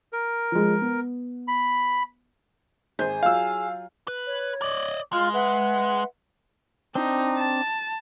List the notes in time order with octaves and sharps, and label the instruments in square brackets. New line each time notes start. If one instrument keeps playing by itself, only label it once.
[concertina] A#4
[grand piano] F3 G#3
B3
[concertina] B5
[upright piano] G#1 C5 G6 [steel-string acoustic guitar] G#4
[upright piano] F#3 F4 [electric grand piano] F5 E6
[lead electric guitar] B4
[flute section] C#5
[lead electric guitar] D5 D#5
[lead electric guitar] G#3 [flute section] F4 F5 F6
[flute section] B4 E5 F#5
[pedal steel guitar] C4 D4 [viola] D#4
[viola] A5